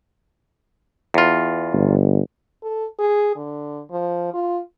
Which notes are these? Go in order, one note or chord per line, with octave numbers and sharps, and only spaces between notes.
E2 F4
G1
A4
G#4
D3
F3
F4